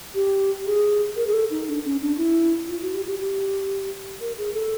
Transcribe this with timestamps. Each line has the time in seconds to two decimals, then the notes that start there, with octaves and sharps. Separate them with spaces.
0.15 G4
0.67 G#4
1.16 A#4
1.27 G#4
1.33 A4
1.51 D#4
1.68 D4
1.85 C#4
2.02 D4
2.18 E4
2.69 F4
2.82 F#4
2.94 G4
3.06 G4
3.19 G4
4.21 A#4
4.38 G#4
4.54 A4